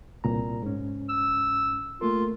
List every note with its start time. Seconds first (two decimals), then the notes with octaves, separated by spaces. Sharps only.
0.24 C2 A#2 A#5
0.63 G#2 C#4
1.09 E6
2.01 A3 A#3 F4 A#4